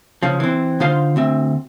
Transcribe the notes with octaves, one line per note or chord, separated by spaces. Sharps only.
C#3 F3
E3 C4
D3 D#4 F4 C5 F5 C6
D2 C4 E5